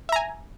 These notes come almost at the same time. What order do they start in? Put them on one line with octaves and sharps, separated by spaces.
E5 A#5 G#5